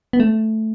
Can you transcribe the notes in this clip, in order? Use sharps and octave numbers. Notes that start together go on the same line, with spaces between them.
B3
A3